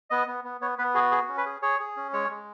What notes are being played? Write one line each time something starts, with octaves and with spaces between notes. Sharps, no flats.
B3 D#5
B3
B3
B3 C#5
B3 B4
F#4 G#4
G#4
C#4
B4
G#4
G#4 C#5
G#4
C#4
G#3 C#5
G#3